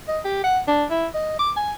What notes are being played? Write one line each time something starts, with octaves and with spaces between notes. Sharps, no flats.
D#5
G4
F#5
D4
E4
D#5
D6
G#5